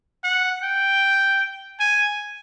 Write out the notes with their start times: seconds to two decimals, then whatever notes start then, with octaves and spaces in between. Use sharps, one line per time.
0.24 F#5
0.63 G5
1.80 G#5